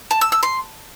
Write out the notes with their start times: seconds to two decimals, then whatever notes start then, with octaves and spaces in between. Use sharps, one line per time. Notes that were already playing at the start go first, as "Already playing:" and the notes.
0.11 A5
0.21 E6
0.32 E6
0.43 C6